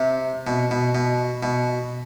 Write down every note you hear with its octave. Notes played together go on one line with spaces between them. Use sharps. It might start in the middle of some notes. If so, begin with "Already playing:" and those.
Already playing: C3
B2
B2
B2
B2